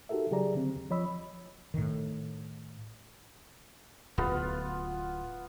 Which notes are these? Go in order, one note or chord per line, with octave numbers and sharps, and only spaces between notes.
D#4 F#4 G4 A4 A#4 E5
C#3 F#3 G4 G#4 D5 A#5
D3 C4
D#2
F3 C#5 D#5 B5 E6
A2 D#3
D1 B3 F4